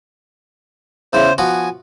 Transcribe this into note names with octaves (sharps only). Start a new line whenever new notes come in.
E2 C#3 E3 C5
F3 B3 F#4 G#5